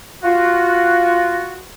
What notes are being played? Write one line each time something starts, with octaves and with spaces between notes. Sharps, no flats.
F4 F#4